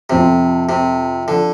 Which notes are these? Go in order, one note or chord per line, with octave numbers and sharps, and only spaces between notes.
F2 C3 F3 C4
C3
D3 F3